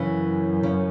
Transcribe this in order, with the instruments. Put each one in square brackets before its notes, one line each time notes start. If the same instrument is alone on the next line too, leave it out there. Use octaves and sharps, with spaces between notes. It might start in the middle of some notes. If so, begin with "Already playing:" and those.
Already playing: [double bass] F#2 [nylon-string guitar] C#3 E3
[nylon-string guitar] C#3